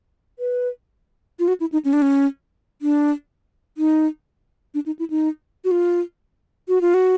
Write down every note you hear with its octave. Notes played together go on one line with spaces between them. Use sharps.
B4
F4
F#4
E4
D#4
C#4
D4
C#4
D4
D#4
D4
D#4
E4
D#4
F#4
F4
F#4
F4
F#4